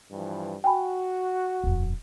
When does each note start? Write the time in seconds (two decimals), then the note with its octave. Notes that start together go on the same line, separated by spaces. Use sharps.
0.11 G2 E3 F3
0.64 F#4 G5 G#5 B5
1.64 D#1 F2